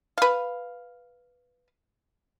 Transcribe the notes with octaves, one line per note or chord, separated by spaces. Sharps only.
B4 F5